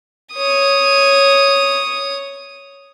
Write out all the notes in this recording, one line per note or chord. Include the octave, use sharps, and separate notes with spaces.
C#5 D#6